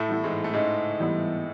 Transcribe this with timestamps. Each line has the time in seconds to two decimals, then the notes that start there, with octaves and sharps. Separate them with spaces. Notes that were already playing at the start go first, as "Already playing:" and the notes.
Already playing: A2 A3
0.09 E3 G3 B3 E4
0.24 G#2 G#3
0.44 A3
0.53 G#2 C#3 G#3
1.00 E3 G3 B3 E4